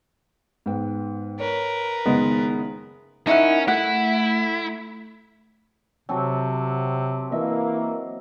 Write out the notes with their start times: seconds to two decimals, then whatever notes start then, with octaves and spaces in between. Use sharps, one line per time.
0.66 G#2 B3 G5
1.40 A#4 B4 C#5
2.05 F#1 D#3 G#3 B3 D#5
3.27 C#4 D#4 E4 A#4 F#5
3.68 A3 E4 F#5
6.09 C3 F#3 C4 A4
7.32 E3 A#3 D#5 E5